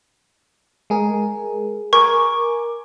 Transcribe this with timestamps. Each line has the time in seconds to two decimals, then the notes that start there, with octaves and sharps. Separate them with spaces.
0.90 G#3 G#4 A#4
1.93 A#4 G#5 C#6 D6